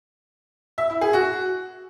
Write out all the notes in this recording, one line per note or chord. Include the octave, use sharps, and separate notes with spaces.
E5
E4
G#4
F#4